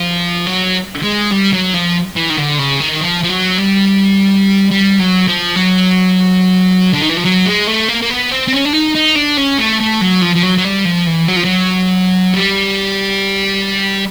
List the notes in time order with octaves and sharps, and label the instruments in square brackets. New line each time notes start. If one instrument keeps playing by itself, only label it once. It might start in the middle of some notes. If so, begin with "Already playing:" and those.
Already playing: [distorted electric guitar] F3
F#3
G#3
G3
F#3
F3
E3
D#3
D3
C#3
D#3
F3
F3
F#3
G3
G3
F#3
F3
F#3
D3
D#3
E3
F3
F#3
G#3
A3
A#3
A#3
B3
C4
C4
C#4
D4
D#4
D#4
D4
C#4
A3
A3
F#3
F3
F3
F#3
F#3
G3
F3
E3
F#3
F3
F#3
G3